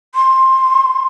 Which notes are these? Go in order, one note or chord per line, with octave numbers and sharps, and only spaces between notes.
C6